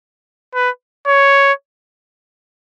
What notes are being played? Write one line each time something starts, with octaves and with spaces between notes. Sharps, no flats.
B4
C#5